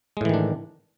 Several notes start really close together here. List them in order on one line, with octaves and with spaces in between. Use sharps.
G#3 A2 E3 D#3 D4